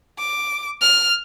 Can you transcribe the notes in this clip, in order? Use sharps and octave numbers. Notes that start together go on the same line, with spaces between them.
D6
F6